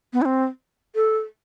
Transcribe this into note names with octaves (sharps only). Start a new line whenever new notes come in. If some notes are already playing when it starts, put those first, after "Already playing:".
B3
E4
C4
A4